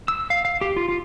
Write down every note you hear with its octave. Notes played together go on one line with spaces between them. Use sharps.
E6
F5
F5
G4
F4
F4